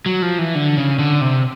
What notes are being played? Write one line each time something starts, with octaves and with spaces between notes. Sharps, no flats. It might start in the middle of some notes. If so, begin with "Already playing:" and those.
F#3
F3
E3
D3
C#3
D3
C3